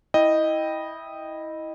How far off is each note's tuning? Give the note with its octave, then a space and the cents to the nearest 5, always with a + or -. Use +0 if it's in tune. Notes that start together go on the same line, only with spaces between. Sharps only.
E4 -15 D#5 -5 G5 +0